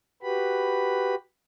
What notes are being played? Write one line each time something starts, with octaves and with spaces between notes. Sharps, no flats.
F#4 G4 B4 B5